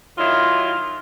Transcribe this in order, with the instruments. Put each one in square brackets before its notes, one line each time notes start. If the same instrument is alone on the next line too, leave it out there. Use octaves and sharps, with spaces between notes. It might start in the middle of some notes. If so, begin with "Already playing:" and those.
[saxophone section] D#3 F#3 E4 F4